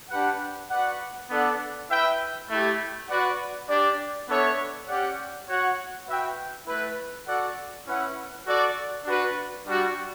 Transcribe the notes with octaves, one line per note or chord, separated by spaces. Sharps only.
D4 G4 B4 F#5
F#4 B4 D5 F#5
B3 D4 A4 D5 F#5
E4 B4 E5 G5
A3 E4 G4
F#4 B4 D5 F#5
D4 G4 D5
B3 D4 A4 C#5 E5
C#4 G4 D5 F#5
F#4 C#5 F#5
F#4 B4 E5 G5
A3 E4 B4
F#4 A4 D5 F#5
C#4 E4 B4 F#5
F#4 A4 D5
D4 F#4 B4
G3 D4 F#4